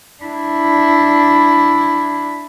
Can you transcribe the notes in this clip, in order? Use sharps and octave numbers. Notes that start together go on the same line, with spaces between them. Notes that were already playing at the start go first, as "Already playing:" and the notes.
D4 E4